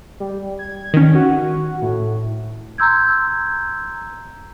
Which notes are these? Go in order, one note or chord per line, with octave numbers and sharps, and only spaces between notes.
G3
G#6
D#3 C#4
F#4
A2
A#5 C6 E6 G6 G#6